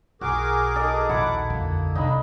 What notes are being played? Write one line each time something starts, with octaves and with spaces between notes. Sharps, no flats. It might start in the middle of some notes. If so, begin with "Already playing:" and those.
B1 F#4 G#4 A#4 D6
A4 D#5 A#5
A#1 D#2 A#2 E4 F#5 D6
F2 D3 A#3
C2 D4 D#4 B5